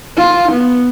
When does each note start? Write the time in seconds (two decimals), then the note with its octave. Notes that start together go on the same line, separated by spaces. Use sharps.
0.17 F4
0.52 B3